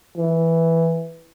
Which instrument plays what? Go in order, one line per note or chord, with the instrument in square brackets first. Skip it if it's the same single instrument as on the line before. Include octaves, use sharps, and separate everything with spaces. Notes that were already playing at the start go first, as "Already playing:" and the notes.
[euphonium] E3